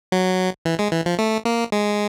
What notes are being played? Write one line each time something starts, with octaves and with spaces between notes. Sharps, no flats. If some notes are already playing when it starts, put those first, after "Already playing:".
F#3
E3
G#3
E3
F3
A3
A#3
G#3